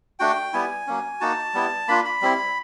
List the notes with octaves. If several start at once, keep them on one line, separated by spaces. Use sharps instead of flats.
A3 D4 F#4 G5
G3 B3 E4 G#5
F#3 A#3 C#4
A#3 D#4 F#4 A5
G3 B3 E4
A#3 D4 F4 B5
B5
G3 C4 E4